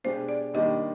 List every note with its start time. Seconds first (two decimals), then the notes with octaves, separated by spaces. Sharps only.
0.04 B2 G#3 D4 G4 C5
0.29 D5
0.54 D#2 D#3 G3 D4 G4 D#5